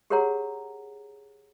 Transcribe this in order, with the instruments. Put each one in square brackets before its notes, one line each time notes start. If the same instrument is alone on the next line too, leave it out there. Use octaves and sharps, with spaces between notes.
[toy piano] G4 G#4 A#4 C#5 F#5 A#5